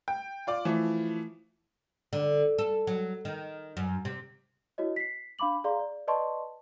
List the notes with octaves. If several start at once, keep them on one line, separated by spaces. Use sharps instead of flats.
G5
F4 D5 D6
E3 F3 A3
D3
A4
F#3
D#3
F#2
C3
E4 F#4 C#5 D#5
B6 C7
D4 F5 B5 D6 F#7
G#4 D5 F5 A#5 C6
D5
B4 D5 D#5 A5 C6 C#6